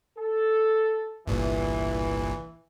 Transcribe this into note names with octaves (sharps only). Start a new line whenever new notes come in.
A4
G1 C2 A#2 E3